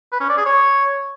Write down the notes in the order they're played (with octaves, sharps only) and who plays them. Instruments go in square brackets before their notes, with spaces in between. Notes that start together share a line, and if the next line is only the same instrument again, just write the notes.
[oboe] B4
C#4
D5
G#4
C#5